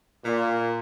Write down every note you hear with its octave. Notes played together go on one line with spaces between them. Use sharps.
A#2